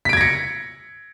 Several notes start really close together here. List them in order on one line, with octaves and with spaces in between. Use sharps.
B6 D7 G#6 A#6 C#7